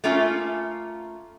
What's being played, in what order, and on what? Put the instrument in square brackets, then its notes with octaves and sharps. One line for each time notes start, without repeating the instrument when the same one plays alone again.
[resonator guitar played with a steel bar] A3 A#3 C#4 F4